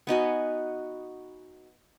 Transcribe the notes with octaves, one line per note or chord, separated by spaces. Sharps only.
B3 D#4 F#4 G#5